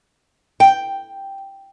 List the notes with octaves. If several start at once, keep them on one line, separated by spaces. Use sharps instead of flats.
G5